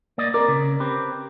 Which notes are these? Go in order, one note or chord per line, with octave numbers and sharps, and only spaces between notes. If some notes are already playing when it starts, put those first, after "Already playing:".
A#3 D5 D#5
C4 A#4 D5
C#3
C4 G4 B4